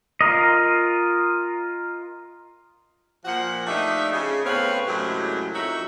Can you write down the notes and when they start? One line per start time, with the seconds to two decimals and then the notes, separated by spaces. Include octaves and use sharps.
0.21 F4 A#4 D#5
3.25 A#2 F3 F#5
3.66 F3 A3 D4 D#4 G4 E5
4.12 C#3
4.45 A2 B3 C4 B4 C#5 F5
4.87 F#2 A2 C3 F#3 G#3
5.53 F2 D#4 F#4 C#5 E5